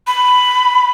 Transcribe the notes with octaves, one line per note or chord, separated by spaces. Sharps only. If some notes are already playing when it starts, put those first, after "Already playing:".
B5